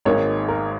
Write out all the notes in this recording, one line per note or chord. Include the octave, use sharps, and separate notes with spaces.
G#1 G#2 D#3 A#3 C#5
A#4